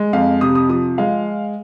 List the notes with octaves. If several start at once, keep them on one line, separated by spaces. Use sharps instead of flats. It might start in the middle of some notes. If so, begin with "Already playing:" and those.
Already playing: G#3
F2 F5
C3 D#6
D#6
F3 D#6
G#3 F5